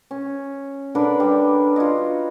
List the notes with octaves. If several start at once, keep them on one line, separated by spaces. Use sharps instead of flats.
C#4
D3 D4 A#4 B4
G3
F4 F#4 C#5 D#5